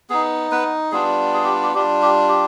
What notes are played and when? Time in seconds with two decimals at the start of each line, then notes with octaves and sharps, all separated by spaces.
0.10 B3 D#4 G#4
0.51 B3 B4
0.91 G3 B3 D4 F4 G#4
1.34 G#4
1.43 G4
1.63 G4
1.74 G3 D4 F4 G4
2.02 G4
2.28 G4